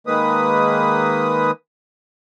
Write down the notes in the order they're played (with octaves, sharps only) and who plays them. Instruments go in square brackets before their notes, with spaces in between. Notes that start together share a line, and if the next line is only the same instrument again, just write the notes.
[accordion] D#3 G#3 A#3 B4 D#6